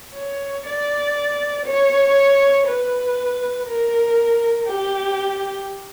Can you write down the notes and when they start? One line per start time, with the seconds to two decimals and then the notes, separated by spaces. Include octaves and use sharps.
0.16 C#5
0.67 D5
1.66 C#5
2.67 B4
3.66 A#4
4.67 G4